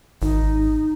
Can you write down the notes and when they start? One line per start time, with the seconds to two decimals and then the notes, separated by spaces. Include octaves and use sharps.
0.22 G#1 D#4